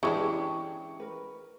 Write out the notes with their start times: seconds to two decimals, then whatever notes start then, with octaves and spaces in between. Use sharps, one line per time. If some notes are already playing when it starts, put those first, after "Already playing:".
0.03 E3 G#3 C#4 D4 G4 G#4 C#6
1.00 A#4 B4